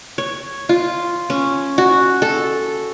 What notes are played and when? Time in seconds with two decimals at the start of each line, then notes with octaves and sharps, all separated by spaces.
0.18 C#5
0.69 F4
1.30 C#4
1.78 F#4
2.22 A4